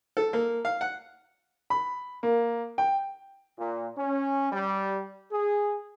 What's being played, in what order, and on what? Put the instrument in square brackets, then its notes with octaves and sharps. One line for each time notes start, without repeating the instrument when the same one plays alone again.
[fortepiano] A4
A#3
F5
F#5
[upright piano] B5
A#3
G5
[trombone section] A#2
C#4
G3
G#4